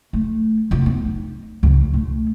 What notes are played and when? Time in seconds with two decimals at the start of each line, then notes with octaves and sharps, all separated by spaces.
0.13 A3
0.71 F1 F4
0.86 B3
1.05 D#4
1.63 C#2 C#3
1.94 B2 A3